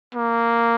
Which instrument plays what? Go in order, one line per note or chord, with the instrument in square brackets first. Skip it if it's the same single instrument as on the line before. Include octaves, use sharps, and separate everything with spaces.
[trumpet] A#3